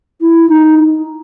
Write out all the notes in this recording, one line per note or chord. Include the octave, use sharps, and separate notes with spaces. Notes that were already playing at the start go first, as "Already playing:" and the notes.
E4
D#4